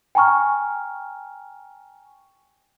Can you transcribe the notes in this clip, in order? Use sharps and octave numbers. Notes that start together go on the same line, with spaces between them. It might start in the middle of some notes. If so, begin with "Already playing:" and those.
G5 G#5 A#5 C#6 F6